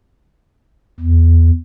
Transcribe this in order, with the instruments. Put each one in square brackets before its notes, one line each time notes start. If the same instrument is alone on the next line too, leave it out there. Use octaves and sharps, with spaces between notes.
[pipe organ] E2